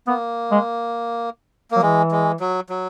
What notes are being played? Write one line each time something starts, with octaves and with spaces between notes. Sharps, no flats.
A#3 B3
G#3
F#3 A#3
E3 G#3
G#3
F#3
F#3